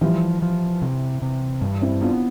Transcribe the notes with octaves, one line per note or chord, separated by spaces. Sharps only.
E3 F3 G3
F3
C3
C3
G2
C4 E4
B3 D4 F4